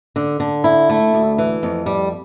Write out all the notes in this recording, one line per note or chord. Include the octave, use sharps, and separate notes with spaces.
D3
D3
E4
A3
D2
E3
F2
G3